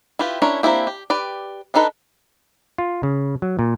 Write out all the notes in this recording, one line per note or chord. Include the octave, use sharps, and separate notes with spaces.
E4 F4 G4 B4
C#4 D4 E4 A#4 C#5
A#3 C4 D4 E4 G4
G4
G4 B4 D5
B3 D4 D#4 A4 B4
F4
C#3
F#3
A#2